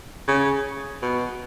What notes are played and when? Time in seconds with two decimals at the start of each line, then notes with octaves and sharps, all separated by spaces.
0.28 C#3
1.02 B2